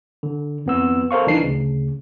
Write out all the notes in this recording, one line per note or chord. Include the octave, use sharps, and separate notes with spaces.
D3
F2 B3 E6
A4 A#4 C5 F5 C#6
B1 E3 D4 D#4 C7
D2 C#3